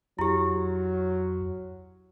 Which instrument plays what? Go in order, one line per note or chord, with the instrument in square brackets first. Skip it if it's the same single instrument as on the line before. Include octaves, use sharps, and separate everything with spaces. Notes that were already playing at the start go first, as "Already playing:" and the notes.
[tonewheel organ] F2 [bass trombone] F#3 [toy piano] E4 G4